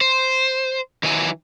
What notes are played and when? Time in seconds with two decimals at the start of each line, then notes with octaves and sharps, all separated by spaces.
0.01 C5
1.03 D#3 E3 F#3 G#5